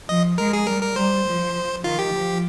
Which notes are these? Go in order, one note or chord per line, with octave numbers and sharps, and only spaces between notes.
F3 D#5
G#3 A#4
G#4
G3 A#4
A#4
G3 C5
F3
D#3 F4
G4
F3